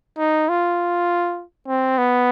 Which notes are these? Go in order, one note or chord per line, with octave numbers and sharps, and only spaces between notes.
D#4
F4
C4
B3